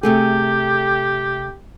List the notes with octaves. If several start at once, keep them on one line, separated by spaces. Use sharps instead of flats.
C3 A3 G4 G#4